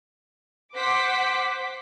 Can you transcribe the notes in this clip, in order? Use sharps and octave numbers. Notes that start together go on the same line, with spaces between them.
C5 F#5 D6 B6